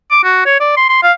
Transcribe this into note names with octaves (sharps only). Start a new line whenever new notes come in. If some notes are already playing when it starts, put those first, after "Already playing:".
D6
F#4
C#5
D5
C6
C6
F5